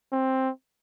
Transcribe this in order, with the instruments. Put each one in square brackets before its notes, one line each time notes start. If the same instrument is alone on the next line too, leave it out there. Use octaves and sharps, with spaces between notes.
[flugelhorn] C4